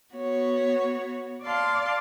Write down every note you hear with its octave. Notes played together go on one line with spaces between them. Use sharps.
B3 F#4 C#5
D5 F5 A5 C6